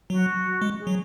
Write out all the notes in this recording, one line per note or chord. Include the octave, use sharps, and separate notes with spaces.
F#3 F#4
G#3
G#4
F#3